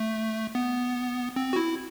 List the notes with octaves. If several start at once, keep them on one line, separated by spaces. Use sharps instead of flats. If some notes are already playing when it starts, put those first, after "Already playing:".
Already playing: A3
B3
C4
F#4
E4